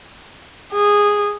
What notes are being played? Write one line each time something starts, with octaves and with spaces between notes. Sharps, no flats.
G#4